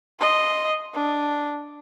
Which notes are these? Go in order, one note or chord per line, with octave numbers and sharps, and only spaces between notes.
D#5 C6
D4